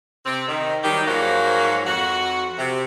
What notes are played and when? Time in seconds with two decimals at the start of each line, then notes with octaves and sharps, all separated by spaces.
0.25 C3 C4
0.48 D#3
0.84 D#3 F#3 G3 G4
1.08 G#2 F3 F#3 A#3 F#4
1.87 F2 F#4
2.58 C3